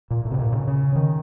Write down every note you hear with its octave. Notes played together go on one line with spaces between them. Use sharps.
A#2
A2
C3
A#2
C#3
C#3
D#3